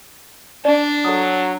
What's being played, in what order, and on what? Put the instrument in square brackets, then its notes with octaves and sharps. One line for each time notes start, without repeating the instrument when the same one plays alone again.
[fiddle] D4 [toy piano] D5
[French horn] F#3 [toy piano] A4 D#6